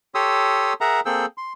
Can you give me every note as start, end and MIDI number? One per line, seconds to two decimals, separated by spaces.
0.15 0.73 67
0.15 0.73 69
0.15 0.73 73
0.15 0.73 84
0.15 0.73 87
0.15 0.73 88
0.81 1.00 68
0.81 1.00 70
0.81 1.00 76
0.81 1.00 78
0.81 1.00 82
1.05 1.26 58
1.05 1.26 60
1.05 1.26 68
1.05 1.26 69
1.05 1.26 79
1.05 1.26 88
1.38 1.53 84